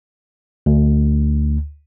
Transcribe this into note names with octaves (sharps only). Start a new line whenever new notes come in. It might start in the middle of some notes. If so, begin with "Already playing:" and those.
D2